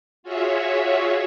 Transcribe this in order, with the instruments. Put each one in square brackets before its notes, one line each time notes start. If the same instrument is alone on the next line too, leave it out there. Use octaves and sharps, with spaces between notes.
[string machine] F4 F#4 G#4 C#5 E5